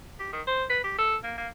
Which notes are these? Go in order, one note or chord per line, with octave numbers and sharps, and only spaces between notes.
G4
D#3
C5
B4
G4
A4
A#3
A#3